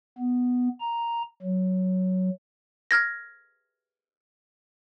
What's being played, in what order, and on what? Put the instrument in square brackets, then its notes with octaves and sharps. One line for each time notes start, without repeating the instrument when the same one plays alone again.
[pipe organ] B3
A#5
F#3
[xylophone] F6 G#6 A#6